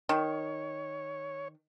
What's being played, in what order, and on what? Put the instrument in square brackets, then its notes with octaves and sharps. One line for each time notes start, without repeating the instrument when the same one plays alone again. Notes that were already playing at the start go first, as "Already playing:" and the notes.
[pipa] D#3 [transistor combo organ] C#5